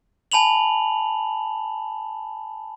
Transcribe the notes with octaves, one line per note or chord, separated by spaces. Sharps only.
G#5 A5 B5 F7 F#7